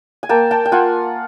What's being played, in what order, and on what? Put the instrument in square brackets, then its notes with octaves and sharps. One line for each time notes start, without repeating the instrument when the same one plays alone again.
[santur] G#5
A#3 G5 A5
G5 A5
G5
F4 F#5 G#5